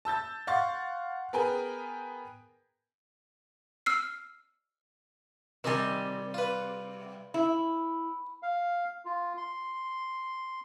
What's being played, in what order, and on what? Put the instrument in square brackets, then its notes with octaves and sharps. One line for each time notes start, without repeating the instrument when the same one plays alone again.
[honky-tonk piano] A5 E6 G6 A6
F5 F#5 C6 C#6 A6
B3 G#4 A#4 B4 G5 G#5
[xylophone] E6 F6 C7
[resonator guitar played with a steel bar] C3 G3 [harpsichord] D#3 D#4 G#5
[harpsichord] F4 B4
[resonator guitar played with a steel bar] E4
[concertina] F5
F4
C6